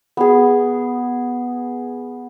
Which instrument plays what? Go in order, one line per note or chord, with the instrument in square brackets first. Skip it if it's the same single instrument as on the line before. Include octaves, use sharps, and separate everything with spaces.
[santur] B3 G#4